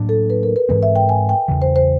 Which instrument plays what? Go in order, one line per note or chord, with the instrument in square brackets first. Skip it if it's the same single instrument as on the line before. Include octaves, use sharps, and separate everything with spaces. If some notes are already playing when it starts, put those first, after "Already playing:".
Already playing: [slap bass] A2 F#3 A#3 D4
[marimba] A4
B4
A#4
B4
[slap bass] G#2 E3 G#3 C4 [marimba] B4
[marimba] E5
G5
G#5
G5
[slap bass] E2 C#3 E3
[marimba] C5
C5